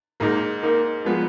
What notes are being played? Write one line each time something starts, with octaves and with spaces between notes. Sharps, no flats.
G#2 A#3 D#4 A#4
A#3 D#4 A#4
F3 G#3 B3 F4